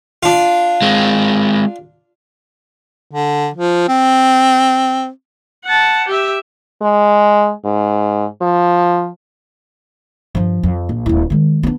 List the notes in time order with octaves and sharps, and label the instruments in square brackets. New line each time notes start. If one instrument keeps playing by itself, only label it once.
[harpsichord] D4 F4
[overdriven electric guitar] G#3 C4
[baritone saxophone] D3
F3
C4
[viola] F#5 A5
G4 E5
[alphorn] G#3
G#2
F3
[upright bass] G2 F3
F2
A#1
D#1 E4
D#3 G#3
B3 D4